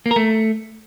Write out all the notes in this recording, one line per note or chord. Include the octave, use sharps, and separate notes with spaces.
A#3
A#4
A3